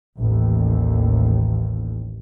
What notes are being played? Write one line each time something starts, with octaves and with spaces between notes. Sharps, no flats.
A1 D#2